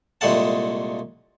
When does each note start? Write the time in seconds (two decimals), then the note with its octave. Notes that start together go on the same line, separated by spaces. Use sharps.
0.21 C2 A#2 G#3 A3 F#5 A5